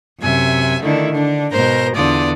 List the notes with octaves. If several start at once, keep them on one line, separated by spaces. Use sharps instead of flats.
F#2 C3 E5 G#5
D3 D#3 A3 D4 E4
D3 D4
G#2 B2 A#4 C5 G6 A#6
E2 D3 F4 D5 D#6